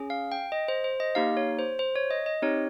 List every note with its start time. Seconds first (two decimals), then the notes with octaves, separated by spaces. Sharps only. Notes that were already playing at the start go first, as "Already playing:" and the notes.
Already playing: C#4 G#4
0.10 F5
0.32 G5
0.52 D#5
0.68 C5
0.84 C5
1.00 D#5
1.15 A#3 D#4 G4 F5
1.37 C#5
1.59 C5
1.79 C5
1.96 C#5
2.11 D#5
2.26 D#5
2.42 C4 D#4 G4 C#5